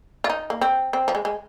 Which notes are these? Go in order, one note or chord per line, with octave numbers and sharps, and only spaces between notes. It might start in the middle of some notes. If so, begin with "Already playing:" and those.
F4
D#4
A#3
C4
C4
F3
G#3
G#3